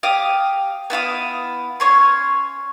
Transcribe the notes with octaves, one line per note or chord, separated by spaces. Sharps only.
G4 F5 D#6
B3 E4 F5 D#6
C#4 C#5 C6